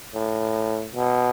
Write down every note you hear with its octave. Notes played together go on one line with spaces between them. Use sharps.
A2
B2